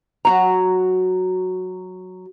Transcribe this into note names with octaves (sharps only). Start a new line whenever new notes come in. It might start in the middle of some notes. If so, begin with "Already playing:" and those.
F#3 F#4 A#5